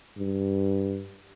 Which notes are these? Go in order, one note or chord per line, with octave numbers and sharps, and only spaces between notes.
G2